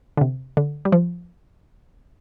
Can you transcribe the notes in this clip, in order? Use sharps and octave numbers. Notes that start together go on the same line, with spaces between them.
D3
C3
D3
G3
F3